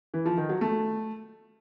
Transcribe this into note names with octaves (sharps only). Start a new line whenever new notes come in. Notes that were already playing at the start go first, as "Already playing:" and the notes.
E3
F3
D#3
F#3
A3